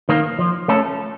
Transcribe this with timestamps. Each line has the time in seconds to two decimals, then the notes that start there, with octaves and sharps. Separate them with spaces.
0.09 D#3 A#3
0.39 F3
0.68 A3 C#4 A4